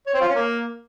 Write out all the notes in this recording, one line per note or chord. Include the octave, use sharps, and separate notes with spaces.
C#5
C4
F4
C#4
A#3